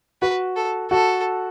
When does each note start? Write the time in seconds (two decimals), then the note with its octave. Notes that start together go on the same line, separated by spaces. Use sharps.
0.22 F#4 B4
0.56 A4
0.91 F#4 A4